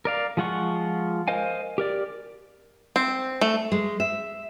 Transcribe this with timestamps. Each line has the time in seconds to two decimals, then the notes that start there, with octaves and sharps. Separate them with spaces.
0.05 A#4 D5 F5
0.37 F3 G#3 F4 F#5 C#6
1.28 A#4 C5 D#5 F5 G#5
1.78 G4 A#4 D5
2.96 C4
3.41 A3
3.72 G#3
4.00 E5